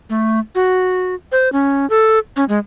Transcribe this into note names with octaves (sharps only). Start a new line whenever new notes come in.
A3
F#4
C5
C#4
A4
C#4
G#3